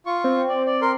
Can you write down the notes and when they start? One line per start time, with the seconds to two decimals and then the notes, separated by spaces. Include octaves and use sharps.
0.06 F4 C#6
0.24 C4
0.49 D5
0.66 D5
0.82 A#4 C6